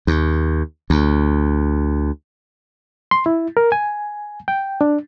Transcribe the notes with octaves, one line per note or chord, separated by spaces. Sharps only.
D#2
D2
C6
E4
A#4
G#5
G5
D4